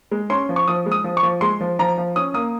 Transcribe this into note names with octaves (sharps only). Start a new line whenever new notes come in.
G#3
C#4 C6
F3
C#6
F3 D#6
G#3
D#6
F3
C#6
F3
G#3 C6
F3
F3 A#5
F3
C#4 D#6
A#3 D#6